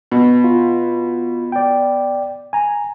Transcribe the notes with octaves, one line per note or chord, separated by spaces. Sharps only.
B2
F4
D5 G5
G#5 A#5